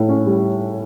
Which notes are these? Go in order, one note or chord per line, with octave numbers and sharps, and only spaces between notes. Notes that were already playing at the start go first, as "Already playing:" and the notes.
Already playing: A2 E4
C#4
G3